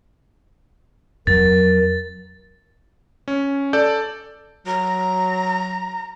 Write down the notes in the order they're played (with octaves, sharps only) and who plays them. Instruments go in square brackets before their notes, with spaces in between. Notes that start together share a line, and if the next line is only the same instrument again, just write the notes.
[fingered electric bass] F2 F#3 [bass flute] A#4 [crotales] A6
[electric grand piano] C#4
A4 D5 G6
[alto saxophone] F#3 [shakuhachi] A#5